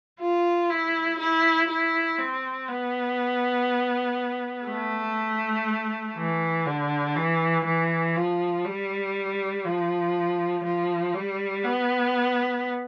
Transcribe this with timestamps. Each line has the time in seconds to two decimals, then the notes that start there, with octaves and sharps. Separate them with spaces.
0.20 F4
0.70 E4
1.19 E4
1.69 E4
2.19 C4
2.68 B3
4.67 A3
6.17 E3
6.66 D3
7.16 E3
7.65 E3
8.16 F3
8.65 G3
9.65 F3
10.64 F3
11.14 G3
11.64 B3